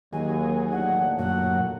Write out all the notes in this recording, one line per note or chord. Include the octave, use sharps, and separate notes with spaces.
D#2 D#3 F#3 G#4 G#5
D#2 A2 D3 F#5
F#2 A#2 F#3 F#5